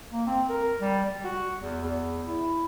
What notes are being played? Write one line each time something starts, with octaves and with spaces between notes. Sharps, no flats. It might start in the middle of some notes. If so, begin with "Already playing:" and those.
A#3
C4
A#4
G3
G3
F#4
E2
E2
E4